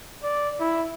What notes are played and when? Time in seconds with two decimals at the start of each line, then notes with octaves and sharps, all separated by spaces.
0.23 D5
0.60 E4